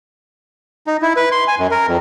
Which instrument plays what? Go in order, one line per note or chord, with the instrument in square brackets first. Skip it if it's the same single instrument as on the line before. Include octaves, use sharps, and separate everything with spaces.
[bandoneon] D#4
E4
B4
C6
G#5
F#2
A#4
F2